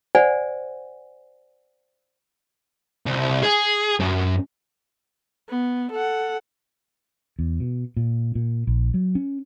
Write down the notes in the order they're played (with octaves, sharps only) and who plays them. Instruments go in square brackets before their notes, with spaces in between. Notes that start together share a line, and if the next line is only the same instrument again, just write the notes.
[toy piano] C5 D5 F#5 G#5
[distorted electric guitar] C2
G#4
F#2
[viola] B3
A4 F#5
[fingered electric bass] E2
B2
A#2
A#2
A#1
F#3
C#4